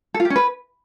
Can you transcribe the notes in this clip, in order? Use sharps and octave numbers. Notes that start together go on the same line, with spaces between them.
A4
F4
G4
C#4
B4